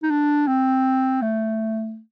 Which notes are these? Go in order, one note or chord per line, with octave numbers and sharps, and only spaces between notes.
D#4
D4
C4
A3